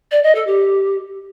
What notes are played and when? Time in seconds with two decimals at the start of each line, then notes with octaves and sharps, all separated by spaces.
0.11 D5
0.23 D#5
0.35 A4
0.46 G4